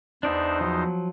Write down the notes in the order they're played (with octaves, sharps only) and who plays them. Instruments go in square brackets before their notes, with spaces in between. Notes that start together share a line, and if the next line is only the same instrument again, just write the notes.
[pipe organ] E2 D#4 C5 [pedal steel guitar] D4 D5 E5
[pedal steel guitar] F3 F#3